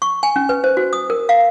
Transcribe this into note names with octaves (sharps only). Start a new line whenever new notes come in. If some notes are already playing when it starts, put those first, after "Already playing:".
C#6
G#5
C#4
B4
C5
F#4
D#6
A#4
F5